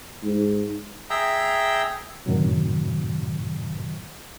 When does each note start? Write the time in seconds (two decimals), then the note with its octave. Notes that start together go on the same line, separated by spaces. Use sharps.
0.24 G#2
1.10 G#4 E5 G5 A#5
2.26 F#2 A2 C3 D#3 F#3